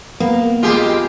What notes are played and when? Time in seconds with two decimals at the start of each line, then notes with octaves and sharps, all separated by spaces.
0.20 A#3 B3
0.63 B1 F2 G#3 F4 G4 G#4